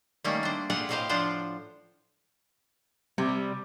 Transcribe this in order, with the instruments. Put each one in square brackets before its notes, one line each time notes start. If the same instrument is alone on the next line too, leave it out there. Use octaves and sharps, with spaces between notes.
[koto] D#3 G3 A3 A#3 C#4
D4 C5
F4 G4 G#4 B4 F#5
A2 C3 G4 C5 D#5 F5
F3 D4 F4 C5 F#5
[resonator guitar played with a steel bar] C3 [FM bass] G3